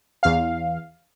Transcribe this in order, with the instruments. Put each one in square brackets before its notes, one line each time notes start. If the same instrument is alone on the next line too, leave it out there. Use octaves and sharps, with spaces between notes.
[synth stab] E2 F5